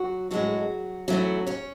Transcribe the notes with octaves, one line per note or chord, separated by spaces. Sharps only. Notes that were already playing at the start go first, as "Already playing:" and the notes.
Already playing: F#3 F#4
A2 F#3 G#3 C#4 F#4
E3 F#3 A3 C#4 F#4
C#4 C#5